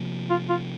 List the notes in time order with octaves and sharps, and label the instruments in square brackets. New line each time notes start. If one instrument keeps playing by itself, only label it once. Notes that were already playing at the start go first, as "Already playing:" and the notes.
Already playing: [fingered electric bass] C3 F3 A#3
[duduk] F4
F4